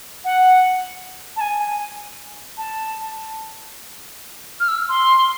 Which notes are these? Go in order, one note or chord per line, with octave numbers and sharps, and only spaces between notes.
F#5
A5
G#5
A5
F6
E6
F6
C6